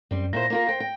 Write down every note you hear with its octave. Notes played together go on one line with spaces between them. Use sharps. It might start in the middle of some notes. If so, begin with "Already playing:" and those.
F#2 G3 C4
A#2 E4 C5 A#6
A#3 F4 A#4
C5 G5
G5